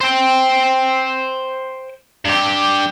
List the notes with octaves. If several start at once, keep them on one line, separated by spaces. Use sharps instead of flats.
C5 G5
G2 G4